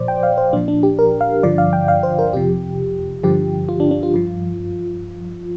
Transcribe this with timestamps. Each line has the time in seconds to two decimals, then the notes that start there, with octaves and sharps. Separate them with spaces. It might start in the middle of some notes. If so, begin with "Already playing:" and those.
Already playing: A#2 F3 C5 D5
0.08 G5
0.23 F5
0.38 C5
0.53 A#2 F3 D4
0.68 D4
0.83 G4
0.99 A#4
1.21 F5
1.43 G2 D3 F3 D5
1.58 F5
1.73 G5
1.88 F5
2.03 C5
2.19 A#4
2.33 F2 C3 F3 G4
3.23 G2 D3 F3 G4
3.69 F4
3.80 D4
3.91 D4
4.03 F4
4.14 G2 F3